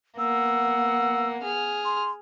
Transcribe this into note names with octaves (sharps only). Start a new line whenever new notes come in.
A#3 B3 F#5 E6
G#4 F6
C6